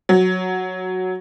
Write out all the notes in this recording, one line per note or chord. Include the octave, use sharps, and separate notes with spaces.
F#3